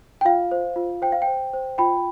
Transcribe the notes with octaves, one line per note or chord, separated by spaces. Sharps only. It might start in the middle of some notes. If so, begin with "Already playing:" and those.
G5
F4 F5
C5
F4
C5 G5
F5
G5
C5
C5
F4 G5 B5